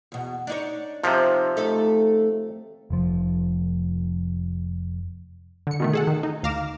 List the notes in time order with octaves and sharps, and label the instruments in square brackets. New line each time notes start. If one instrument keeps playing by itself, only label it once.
[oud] E2 B2
D4 D#4 C#5
[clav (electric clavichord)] C3 F3 [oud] D#4 G4 C5
[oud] A3 D#4 A4
[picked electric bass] F1 F3
[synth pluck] D3 C#7
B2 D#3 A3
G#4 A4 F#5
D#3
D#4
D2 F5 A#5 D6 E7